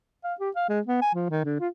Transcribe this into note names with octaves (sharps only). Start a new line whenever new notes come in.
F5
G4
F5
G#3
B3
G#5
F3
D#3
D3
F4